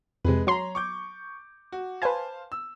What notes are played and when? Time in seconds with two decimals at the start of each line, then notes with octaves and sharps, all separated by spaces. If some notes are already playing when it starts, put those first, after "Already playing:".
0.25 F2 C3 G#3 G#4 B4
0.47 F#3 C#5 A#5 C6
0.75 C#6 D6 G6
1.72 F#4
2.02 B4 C5 F5 G#5 A5
2.52 E6